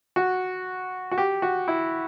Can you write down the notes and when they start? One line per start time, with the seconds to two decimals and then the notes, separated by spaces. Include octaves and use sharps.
0.16 F#4
1.11 F#4
1.18 G4
1.42 F#4
1.68 E4